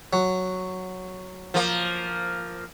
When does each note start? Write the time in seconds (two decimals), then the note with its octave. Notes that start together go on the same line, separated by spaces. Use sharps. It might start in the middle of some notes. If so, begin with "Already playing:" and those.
0.13 F#3
1.54 F3 A#3